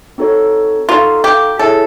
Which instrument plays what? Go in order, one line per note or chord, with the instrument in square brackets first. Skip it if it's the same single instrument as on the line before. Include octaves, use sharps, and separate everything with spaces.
[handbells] C4 D#4 F#4 A4 C#5
[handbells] D#4 F#4 A4 D5 F5 [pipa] F4
[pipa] G4
[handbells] E4 G#4 C#5 E5 A5 [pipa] A4